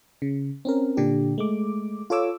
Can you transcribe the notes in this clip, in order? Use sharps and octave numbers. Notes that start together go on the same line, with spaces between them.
C#3
C4 C#4 A#4
A#2 D3 D4 G4
G#3 A3 D6
F4 A4 C#5 D6 E6